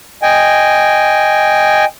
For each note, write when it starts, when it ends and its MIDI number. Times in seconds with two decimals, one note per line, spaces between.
0.23 1.85 75
0.23 1.85 79
0.23 1.85 80